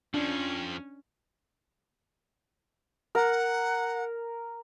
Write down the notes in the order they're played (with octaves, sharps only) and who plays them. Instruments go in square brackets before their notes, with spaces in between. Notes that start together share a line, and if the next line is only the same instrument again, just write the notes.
[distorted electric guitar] F2 F3 [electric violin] C#4 [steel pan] D4
[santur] A#4 [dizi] F#5